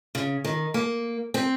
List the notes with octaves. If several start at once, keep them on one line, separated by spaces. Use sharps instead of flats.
C#3
D#3
A#3
C4